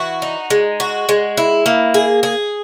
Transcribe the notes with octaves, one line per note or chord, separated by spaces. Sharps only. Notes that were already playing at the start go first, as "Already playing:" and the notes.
Already playing: E3 F#4
D#4
G#3
F#4
G#3
E4
A#3
G#4
G#4